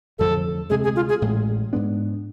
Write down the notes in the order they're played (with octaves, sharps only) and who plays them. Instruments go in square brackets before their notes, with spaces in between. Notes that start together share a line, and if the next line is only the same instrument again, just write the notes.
[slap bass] F1 F2 D3 F3 [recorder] A4
[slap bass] D2 C3 G#3 [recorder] G#4
[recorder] G#4
F4
G#4
[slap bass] A1 A2 G#3
G#2 G#3 B3 D4